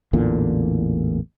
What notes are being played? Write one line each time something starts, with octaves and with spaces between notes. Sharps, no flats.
A1 E2 A#2 D3